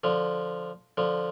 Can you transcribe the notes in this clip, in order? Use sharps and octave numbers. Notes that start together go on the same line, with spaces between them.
D3 F3
D3 F3